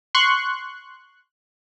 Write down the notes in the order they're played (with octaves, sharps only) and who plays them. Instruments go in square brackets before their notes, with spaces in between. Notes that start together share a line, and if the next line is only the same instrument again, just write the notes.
[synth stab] C6 C#6 F#6